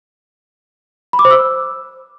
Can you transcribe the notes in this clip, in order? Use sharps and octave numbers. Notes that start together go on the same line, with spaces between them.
B5
D6
C5
E6